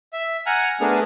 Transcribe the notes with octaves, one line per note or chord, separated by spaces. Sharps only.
E5
F#5 G#5 A#5 F6
A3 B3 D4 G#4 A#4